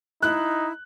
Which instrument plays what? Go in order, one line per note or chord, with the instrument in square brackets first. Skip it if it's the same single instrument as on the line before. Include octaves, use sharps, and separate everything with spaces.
[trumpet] D#4 [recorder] E4 [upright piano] F#6